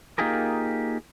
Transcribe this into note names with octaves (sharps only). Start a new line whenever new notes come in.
A#3 D#4 F4 G4 G#4 A#4